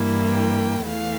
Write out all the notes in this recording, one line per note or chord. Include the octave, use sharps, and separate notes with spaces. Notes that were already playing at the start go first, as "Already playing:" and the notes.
Already playing: G2 E3 A#3 E4
G5
E2 E3 A3 F5